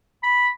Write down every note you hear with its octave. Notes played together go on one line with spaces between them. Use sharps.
B5